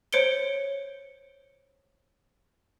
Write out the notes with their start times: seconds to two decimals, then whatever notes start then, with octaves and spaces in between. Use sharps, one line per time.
0.13 C5 C#5 C#7 D7 G7